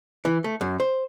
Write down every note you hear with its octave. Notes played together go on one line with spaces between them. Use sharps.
E3
A3
F#2
C5